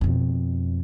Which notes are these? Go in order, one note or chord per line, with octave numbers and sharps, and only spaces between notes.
F2 B2